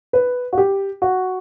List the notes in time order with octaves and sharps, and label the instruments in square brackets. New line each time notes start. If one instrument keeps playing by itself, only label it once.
[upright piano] B4
F#4
G4
F#4